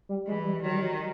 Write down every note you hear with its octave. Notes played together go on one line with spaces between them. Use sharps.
G3
E3 G#3
G3
D#3 F#3
G3
F#3